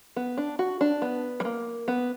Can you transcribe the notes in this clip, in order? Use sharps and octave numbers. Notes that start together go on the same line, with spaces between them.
B3
D4
F#4
D4
B3
G3
A#3
B3